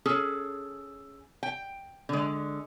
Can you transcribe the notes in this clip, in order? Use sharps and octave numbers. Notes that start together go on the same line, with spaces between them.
C#4 G#4 A4
G5
D3 G#3